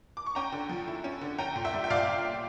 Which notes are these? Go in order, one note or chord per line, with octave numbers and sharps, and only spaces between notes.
D6
C#6
C#4 G5 A#5
D3
F3
E4
C#4
D3
C#4 G5 A#5
A#2
E5 G5
G3
G5
A#2 D5 F5